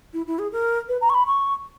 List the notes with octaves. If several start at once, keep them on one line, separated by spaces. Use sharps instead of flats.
E4
E4
G#4
A#4
B4
A#5
C#6
B5
C#6